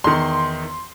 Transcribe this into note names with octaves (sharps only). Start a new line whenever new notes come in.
E2 D#3 C6